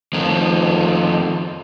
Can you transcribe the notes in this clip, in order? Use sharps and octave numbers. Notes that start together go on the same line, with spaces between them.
F2 D#3